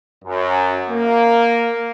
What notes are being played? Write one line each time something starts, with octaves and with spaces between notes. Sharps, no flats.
F#2
A#3